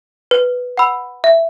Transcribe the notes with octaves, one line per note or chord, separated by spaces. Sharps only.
B4
F#5 B5 E6
E5